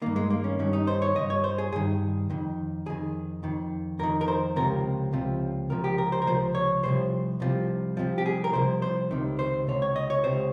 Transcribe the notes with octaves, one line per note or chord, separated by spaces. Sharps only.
G2 D#3 A#3
G#3
A#3
C#4
G2 D#3 C#4
D#4
C5
C#5
G2 D#3 D#5
C#5
C5
G#4
G2 D#3 G#4
F2 D#3
F2 D#3 G#4
F2 D#3
F2 D#3 A#4
A#4
C5
C#2 C3 F3 A#4
C#2 C3 F3
C#2 C3 F3 A#4
G4
A#4
C5
A#4
C#2 C3 F3 C5
C#5
C2 C3 F3 C5
C2 C3 F3
C2 C3 F3
G4
G#4
A#4
C2 C3 F3 C5
C5
C#2 C3 D#3
C5
C#2 C3 C#5
C#5
D#5
C#5
C#2 C3 C5